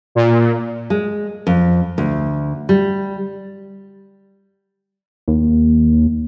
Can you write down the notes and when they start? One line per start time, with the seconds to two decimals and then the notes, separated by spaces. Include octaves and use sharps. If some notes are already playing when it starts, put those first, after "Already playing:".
0.15 A#2
0.90 G#3
1.47 F2
1.98 D2
2.69 G3
5.28 D#2